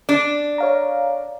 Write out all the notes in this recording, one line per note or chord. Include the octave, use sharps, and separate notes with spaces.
D4
C#5 F5 A#5